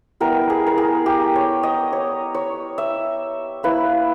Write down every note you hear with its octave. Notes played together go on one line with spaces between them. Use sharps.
G3 B3 E4 A#4
G#4
A#4
G#4
G4
C#5
D#5
C#5
C#5
E5
A#3 E4 B4